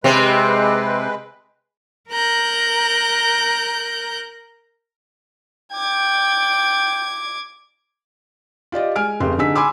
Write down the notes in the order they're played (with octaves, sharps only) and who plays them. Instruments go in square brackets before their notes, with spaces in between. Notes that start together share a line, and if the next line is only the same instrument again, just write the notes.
[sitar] C3 C4 [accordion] G#3 B4
[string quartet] A#4 A#5 F#6 G6
[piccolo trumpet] G5 [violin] D6 G#6
[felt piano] F4 G4 D5 D#5
G#3 G#5 F6 D7
F1 C#3 G4 C6
D3 D#4 G#4 E6 B6
G#5 B5 C6 D6 E6